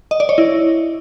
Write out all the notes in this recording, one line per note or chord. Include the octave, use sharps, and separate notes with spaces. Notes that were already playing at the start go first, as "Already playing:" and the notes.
D#5
D5
C#5
E4